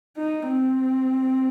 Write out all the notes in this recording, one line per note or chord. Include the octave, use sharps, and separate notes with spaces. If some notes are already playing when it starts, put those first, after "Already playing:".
D#4
C4